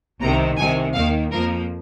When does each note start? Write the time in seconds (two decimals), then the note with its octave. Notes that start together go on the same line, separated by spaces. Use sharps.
0.21 C2 C3 D#3 A#5
0.58 C2 C3 D#3 G#5
0.95 D#2 D#3 A#3 F5
1.32 F2 F3 A#3 A#4